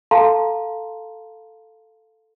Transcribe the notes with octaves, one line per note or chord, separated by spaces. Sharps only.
A4 F5 A5 A#5 C6